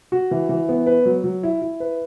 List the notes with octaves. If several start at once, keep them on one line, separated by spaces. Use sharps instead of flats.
F#4
E3
E3
B3
B4
F#3
F#3
E4
E4
B4